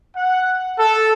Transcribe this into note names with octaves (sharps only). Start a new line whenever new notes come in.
F#5
A4